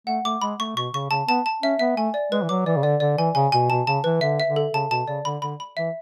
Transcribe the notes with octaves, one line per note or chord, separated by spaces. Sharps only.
A3 F#5
A3 D6
G#3 B5
A3 C#6
B2 C#6
C#3 C#6
C#3 A5
B3 A5
A5
C#4 E5
B3 E5
A3 G#5
D5
G#3 B4
E3
F#3 D6
E3 D5
C#3
D3 D5
D3 D5
E3 G#5
C#3 G#5
B2 G#5
B2 A5
C#3 A5
E3 B4
D3 E5
E5
D3
A4
C#3 A5
B2 A5
C#3 D5
D3 B5
D3 B5
B5
E3 E5